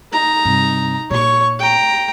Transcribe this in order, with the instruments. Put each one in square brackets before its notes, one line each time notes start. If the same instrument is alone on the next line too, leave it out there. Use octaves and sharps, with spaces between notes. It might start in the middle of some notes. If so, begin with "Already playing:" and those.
[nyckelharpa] D#4 A#5
[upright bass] G2 C3
[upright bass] A#2 [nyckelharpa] C#5 C#6
[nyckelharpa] G5 A#5